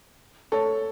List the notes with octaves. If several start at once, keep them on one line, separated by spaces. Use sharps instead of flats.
A4 C#5